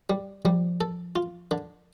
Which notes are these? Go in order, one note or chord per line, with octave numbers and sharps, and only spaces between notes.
G3
F3 G3
A4
F4
D3